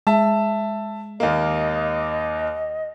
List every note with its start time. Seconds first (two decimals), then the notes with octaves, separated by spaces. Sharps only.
0.07 G#3 E5 A5
1.20 D#2 A#3 D#5